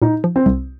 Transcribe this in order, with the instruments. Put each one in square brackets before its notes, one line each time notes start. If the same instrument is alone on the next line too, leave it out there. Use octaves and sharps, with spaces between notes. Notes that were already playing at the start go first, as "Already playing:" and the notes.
[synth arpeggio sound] A#2 [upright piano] D#4
[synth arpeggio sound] F3
[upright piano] C4
[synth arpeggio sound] C2